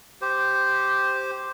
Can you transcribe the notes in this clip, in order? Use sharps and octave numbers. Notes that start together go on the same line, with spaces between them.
G4 C5